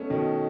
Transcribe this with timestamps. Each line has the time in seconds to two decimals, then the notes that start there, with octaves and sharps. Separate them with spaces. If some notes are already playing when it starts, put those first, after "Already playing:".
Already playing: A3 B3 C#4 D#4
0.10 B2 D#3